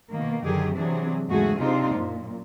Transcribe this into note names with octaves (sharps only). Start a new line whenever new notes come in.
B2 D#3 A#3
F#2 D3 D#3 F#3 G4 G#4
C3 E3 F#3 C4 D4 G#4
E2 G#2 C#3 A3 F#4 G#4
C3 C4 D4 D#4 F4 C5
F#2 A#2